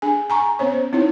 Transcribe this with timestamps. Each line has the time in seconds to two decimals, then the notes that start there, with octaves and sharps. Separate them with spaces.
0.02 D4 G#4 G#5
0.30 G#5 A#5 C#6
0.59 B3 C#4 C5 C#5
0.93 C4 D#4 E4 C#5